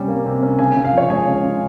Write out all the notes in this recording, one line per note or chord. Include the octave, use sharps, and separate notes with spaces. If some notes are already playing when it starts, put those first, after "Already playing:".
Already playing: C3 G3 C#4
A#3
C3
C#4
C#3 G#5
C#3
F5
F3 C#5
G#3 G#5
C#3
C#3